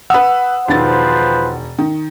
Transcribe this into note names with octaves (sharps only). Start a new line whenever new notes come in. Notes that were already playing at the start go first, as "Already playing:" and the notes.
B4 F#5 D#6 E6
E1 D#3 F3 B4 C5 A6
D#3